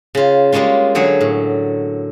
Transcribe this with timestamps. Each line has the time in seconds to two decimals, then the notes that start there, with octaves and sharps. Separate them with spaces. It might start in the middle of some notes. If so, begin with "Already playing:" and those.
0.15 C#3 F4
0.52 G3 G#3 A#3 C#4 F4
0.95 D3 F#3 G#4 C#5
1.21 A2